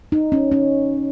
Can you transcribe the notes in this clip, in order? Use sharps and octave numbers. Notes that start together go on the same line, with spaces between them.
D#4
C#4
C#4